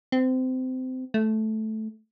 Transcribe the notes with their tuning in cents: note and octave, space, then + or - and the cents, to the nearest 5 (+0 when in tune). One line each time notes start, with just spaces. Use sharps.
C4 -25
A3 -10